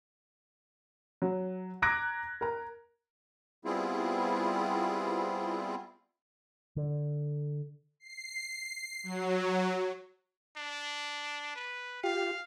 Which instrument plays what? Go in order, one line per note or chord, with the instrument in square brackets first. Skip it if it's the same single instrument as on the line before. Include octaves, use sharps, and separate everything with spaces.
[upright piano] F#3
A#5 D6 F#6 G#6 A#6 D7
A#4 A#5
[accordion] G3 B3 C4 E4 F4 G#4
[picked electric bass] D3
[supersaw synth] C7
F#3
[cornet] D4
B4
[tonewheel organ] F4 G4 [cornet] F5